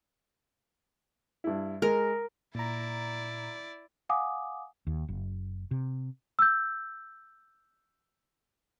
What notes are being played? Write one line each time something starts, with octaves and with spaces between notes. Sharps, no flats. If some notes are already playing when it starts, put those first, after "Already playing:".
G2 E4
G#3 A#4
A#2 E4 D5 A#5
F5 F#5 G#5 D6 D#6
D#2
F#1
C3
E6 G6